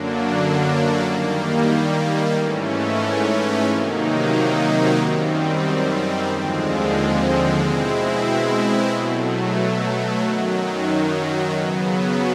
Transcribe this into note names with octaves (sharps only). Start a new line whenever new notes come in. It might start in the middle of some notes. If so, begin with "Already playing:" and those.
Already playing: F#2 D3 F#3 A#3 D4
D#3 G3 A#3
G#2 E3 A3 C#4
C3 D#3 F#3 A#3 D#4
F#2 D#3 G3 C4
D#2 D3 F3 G#3 C4
B2 G#3 C4 E4
B2 F#3 A3
F#2 D#3 F#3
C#3 F#3 B3